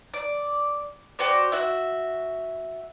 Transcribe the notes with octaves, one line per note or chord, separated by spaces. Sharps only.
D5
F#4 G4 C5 D5
F#4 E5